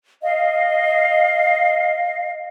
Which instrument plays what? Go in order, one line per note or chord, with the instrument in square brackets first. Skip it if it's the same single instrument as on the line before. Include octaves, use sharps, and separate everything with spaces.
[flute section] D#5 F5